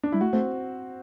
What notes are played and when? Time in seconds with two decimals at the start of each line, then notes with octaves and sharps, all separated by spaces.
0.03 D4
0.12 G3 E4
0.21 A3 F#4
0.33 A3 C4